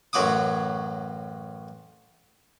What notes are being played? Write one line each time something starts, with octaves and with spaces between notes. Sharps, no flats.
A1 F#2 F#3 A#5 D6 D#6